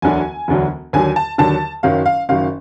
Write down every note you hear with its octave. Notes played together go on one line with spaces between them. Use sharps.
E1 D2 D3 F#3 G#5
E1 D2 D3 F#3
D#2 D3 F#3 G#5
A5
D#2 D3 F#3 A5
F#1 F#2 D#3 F#3 F5
F5
F#1 F#2 D#3 F#3 F5